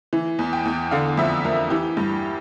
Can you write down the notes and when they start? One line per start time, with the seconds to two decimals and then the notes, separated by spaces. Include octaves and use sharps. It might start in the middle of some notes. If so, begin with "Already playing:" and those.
0.13 E3
0.39 E2
0.53 G5
0.65 E2
0.91 D3 F5
1.17 F2 E5
1.45 F2 A#4
1.70 E3 G4
1.97 G2